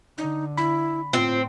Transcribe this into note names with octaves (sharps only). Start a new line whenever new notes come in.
D3 D#4
E4 B5
A2 C4 F4